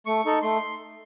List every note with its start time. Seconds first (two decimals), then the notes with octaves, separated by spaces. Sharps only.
0.06 A3 C#6
0.25 D#4 A4
0.42 A3 C6